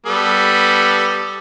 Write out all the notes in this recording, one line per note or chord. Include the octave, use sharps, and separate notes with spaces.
G3 B3 A4